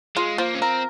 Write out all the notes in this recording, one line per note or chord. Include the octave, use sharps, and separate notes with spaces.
G#3 F4
F3 A#3
C#4
C4 A#4